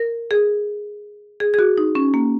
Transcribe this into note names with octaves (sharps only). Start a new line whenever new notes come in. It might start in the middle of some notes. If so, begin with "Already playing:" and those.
Already playing: A#4
G#4
G#4
G#4
F#4
D#4
C#4
A#3